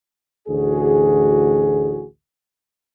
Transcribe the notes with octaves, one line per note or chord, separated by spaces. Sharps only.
A1 D2 F#4 G#4